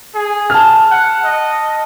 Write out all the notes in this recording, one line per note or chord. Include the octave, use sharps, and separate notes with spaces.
G#4
A5 F6
F#5
D#5